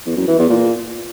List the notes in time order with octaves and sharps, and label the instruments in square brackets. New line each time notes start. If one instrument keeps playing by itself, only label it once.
[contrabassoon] E2
F#2
E3
E2
A#2